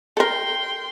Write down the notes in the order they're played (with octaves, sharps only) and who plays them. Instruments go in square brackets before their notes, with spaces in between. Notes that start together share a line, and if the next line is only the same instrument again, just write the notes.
[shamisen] A4 A#4 [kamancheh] G5 C6